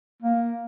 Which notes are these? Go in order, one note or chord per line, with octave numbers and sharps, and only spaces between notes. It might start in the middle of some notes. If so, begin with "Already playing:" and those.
A#3